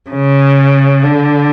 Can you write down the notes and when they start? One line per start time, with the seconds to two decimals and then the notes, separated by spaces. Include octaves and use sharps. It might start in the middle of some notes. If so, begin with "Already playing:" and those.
0.10 C#3
1.03 D3